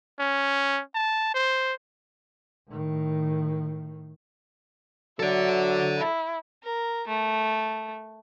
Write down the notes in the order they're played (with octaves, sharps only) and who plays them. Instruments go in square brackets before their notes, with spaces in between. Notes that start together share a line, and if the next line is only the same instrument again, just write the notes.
[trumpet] C#4
A5
C5
[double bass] A2 D#3
[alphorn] F#3 [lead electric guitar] A4 D5 [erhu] E5
[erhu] E4
[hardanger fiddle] A#4
A3